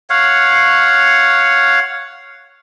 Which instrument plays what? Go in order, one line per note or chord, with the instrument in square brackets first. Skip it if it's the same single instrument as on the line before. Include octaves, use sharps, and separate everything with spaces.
[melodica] C#5 F5 F#5